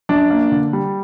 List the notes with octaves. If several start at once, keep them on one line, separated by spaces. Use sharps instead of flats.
F#2 D4
A#3
D3
G3